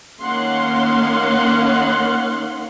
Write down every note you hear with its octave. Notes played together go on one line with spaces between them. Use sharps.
D#3 A#3 C#4 F5 F#5 C6